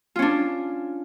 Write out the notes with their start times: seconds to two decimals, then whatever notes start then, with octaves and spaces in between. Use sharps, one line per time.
0.16 F4
0.19 C#4
0.22 D4